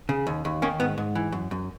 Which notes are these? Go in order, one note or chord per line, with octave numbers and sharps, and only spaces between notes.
C#3
D#2
D#2
D#3 A#3 C#4
G#2 B3
G#2
E3
F#2
F#2